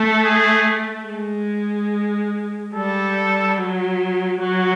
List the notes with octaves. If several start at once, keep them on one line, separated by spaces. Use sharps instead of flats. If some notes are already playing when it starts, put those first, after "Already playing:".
Already playing: A3 A4
G#4
G#3
G3 A4
F#3
F#3 F#4